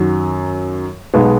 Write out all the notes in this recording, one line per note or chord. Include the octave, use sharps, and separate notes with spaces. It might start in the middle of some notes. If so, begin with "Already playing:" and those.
Already playing: F#2 D#3 F#3
B1 B2 G#3 B3